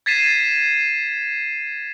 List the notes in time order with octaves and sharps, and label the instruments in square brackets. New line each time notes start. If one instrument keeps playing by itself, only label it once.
[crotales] G#6 A6 B6 C7 D#7 E7